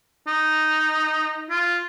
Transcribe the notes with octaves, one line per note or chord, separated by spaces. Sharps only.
D#4
F4